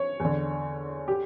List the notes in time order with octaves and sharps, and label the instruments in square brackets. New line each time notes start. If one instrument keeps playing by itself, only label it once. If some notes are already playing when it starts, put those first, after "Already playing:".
Already playing: [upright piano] C#5
E2
D3
G4